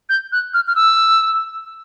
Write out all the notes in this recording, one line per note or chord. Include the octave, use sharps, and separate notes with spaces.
G6
F#6
F6
F6
E6